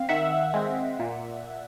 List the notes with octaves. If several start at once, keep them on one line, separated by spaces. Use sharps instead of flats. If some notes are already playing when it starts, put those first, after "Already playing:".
Already playing: C4 F5
D#3 E5 F#5
G#3 C4
A#2